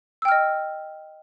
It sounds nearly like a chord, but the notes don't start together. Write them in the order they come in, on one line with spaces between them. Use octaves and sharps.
E6 G5 F6 D#5